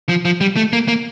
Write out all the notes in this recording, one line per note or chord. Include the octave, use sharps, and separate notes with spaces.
F3
F3
G3
A3
A#3
A#3